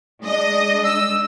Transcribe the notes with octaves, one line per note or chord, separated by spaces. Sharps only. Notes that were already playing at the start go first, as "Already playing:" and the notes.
G#3 D4 D#5
E6